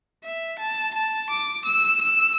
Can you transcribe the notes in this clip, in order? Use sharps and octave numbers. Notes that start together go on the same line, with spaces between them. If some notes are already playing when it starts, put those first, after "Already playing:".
E5
A5
A5
D6
E6
E6